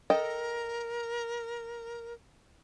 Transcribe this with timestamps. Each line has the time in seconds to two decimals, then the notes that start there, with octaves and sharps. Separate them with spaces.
0.10 A4 A#4 D#5 G5